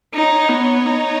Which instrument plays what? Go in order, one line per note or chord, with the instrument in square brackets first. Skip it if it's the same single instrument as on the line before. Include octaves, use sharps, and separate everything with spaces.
[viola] D#4 [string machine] C#5
[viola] B3
D#4